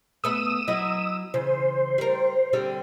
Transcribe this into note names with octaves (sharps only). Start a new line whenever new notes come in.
A3 B3 E5 D#6 E6
F#3 E4 D#5
C#3 E3 C5
G3 A#4
D3 G3 C4